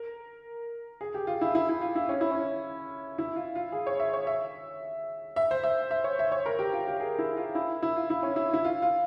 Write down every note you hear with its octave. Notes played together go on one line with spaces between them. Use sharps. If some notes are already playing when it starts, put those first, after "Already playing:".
Already playing: A#4
G#4
G4
F4
E4
E4
E4
F4
E4
C#4
E4
C#4
E4
F4
F4
G#4
C#5
E5
C#5
E5
E5
C5
E5
E5
C#5
E5
C#5
A#4
G4
F4
G4
G#4
E4
F4
E4
E4
F4
E4
C#4
E4
E4
F4
F4